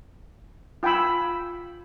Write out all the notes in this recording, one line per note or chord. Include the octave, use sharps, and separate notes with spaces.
F4 G5 G#5 B5 E6